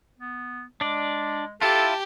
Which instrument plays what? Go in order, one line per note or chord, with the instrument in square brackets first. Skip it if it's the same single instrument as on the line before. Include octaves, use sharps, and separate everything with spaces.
[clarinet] B3
[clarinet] G#3 [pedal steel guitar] D4 D5
[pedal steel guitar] E4 F4 [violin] G4 [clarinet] A4 [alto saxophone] A5